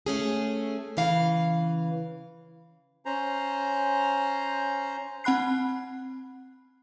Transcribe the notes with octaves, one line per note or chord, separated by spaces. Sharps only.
A3 C#4 G#4
C#3 E3 F5
C#4 C5 A#5
C4 F#5 B5 F#6 C7